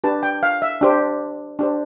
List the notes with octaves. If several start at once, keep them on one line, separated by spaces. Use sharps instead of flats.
D4 G4 B4 A5
G5
F5
E5
D4 G4 C5
D4 G4 C5